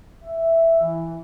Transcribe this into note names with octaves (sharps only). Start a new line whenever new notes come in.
E5
E3